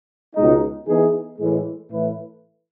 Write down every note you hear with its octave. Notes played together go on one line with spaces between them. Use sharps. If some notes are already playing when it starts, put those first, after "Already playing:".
C#2 B2 G#3 D#4
E3 B3 D#4 G#4
A2 E3 G#3
A2 E3 A3 E4 B4